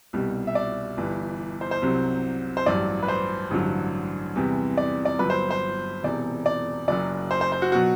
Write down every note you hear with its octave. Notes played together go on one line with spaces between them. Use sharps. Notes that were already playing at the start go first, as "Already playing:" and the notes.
C2 B2 G3
E5
D5
G1 G2 E3
C5
C5
C2 C3 F#3
C5
A1 G2 F#3 D5
B4
C5
A1 G2 D3 F#3
E2 C3 E3 G3
D5
D5
G1 G2 F#3 B4
C5
C5
E1 E2 C3 D5
D5
F#1 F#2 F#3 D5
C5
C5
C5
F#4
B2 F#3 F#4